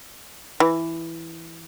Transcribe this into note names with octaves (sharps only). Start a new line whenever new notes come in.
E3